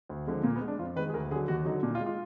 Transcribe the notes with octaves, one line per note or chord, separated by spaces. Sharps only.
D2
D3 F3 G#3
A#2 A#3
B3
G#3
D4
F2 F4
D#3 G#3 B4
G#4
D2 A#4
D3 F#3 G#4
D#2 F#4
D3 F#3 D#4
A#2 D4
F4
G#3
F4